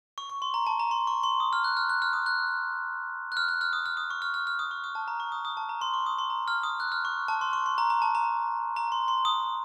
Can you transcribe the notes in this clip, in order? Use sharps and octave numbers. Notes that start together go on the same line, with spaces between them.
C#6
C#6
C6
A#5
A5
A#5
C6
C#6
C6
D#6
F6
F#6
F6
F#6
F6
D#6
F#6
F#6
F6
F#6
F6
D#6
F6
D#6
C#6
F6
F6
F6
D#6
C#6
D#6
A5
A#5
C#6
D#6
D#6
A5
A#5
C6
C#6
D#6
C6
A#5
F6
D#6
F#6
F6
C#6
A5
C6
C#6
C6
A#5
A#5
A5
A#5
A#5
C6
C6
D#6